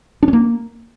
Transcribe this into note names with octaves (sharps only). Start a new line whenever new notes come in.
D4
C#4
A#3